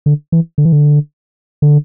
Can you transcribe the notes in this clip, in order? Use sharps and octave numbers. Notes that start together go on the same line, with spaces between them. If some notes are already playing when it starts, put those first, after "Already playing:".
D3
E3
D3
E3
D3
D3